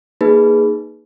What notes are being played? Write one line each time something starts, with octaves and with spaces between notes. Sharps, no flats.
A#3 D#4 G#4 B4